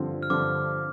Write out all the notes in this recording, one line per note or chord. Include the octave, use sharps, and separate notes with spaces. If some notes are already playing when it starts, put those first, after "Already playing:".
Already playing: G2 D3 F3 C4 F4
F6
G2 D3 F3 C4 F4 D6